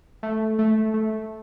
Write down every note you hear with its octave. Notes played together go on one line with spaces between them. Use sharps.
A3
A3
A3